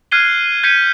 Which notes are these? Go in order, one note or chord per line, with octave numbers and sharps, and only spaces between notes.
F6 F#6 G#6 C7 D#7 G7
G6 G#6 B6 C#7 D#7